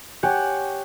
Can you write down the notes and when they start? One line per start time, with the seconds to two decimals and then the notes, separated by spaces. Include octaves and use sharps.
0.23 G4 C#5 F#5 G#5